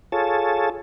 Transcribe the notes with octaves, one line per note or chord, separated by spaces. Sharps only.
F4 G#4 A4 C#5 A5